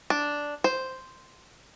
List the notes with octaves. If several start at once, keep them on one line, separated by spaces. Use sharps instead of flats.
D4
C5